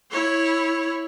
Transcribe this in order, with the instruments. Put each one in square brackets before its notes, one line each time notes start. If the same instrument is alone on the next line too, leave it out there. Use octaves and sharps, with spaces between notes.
[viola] E4 C#5